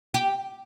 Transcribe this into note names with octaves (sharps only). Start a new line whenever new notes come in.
G4